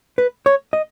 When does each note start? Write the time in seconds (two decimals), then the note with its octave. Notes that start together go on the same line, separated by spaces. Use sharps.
0.18 B4
0.46 C#5
0.73 D#5